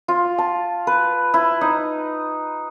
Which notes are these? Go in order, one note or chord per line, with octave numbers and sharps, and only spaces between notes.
F4
A5
B4
E4
D#4